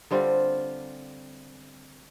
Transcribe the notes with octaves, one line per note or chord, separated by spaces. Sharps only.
D3 G3 C4 F4